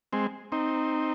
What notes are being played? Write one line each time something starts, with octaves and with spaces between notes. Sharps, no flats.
G#3 C4
C4 D#4